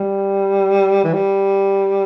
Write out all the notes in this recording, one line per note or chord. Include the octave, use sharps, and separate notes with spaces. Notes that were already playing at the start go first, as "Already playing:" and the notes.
Already playing: G3
E3
G3